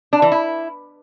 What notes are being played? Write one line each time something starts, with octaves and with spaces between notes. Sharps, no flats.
D4
E3
E4